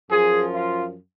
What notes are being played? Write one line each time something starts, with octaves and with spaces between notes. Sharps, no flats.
F#2 F3 G#4
F4